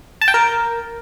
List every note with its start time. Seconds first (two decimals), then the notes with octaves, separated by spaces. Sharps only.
0.21 A5
0.28 G5
0.34 A#4